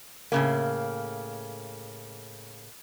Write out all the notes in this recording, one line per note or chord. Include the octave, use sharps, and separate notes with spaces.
A2 C#3 A#3